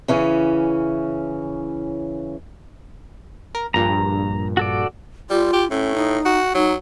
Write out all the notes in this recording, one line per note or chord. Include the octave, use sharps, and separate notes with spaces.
C#3 E3 C#4
A#4
A#1 G2 A#2 A#5
F#4 A4 D5
G3 F4
G4
A2 C#4
D#4
F#4
F#3 D#4